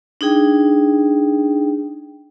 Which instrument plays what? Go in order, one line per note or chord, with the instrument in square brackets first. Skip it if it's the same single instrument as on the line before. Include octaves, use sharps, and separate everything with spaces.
[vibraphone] D4 D#4 G#4 G5